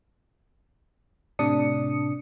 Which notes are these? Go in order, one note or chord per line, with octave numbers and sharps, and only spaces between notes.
A2 C3 D4 D#6 C#7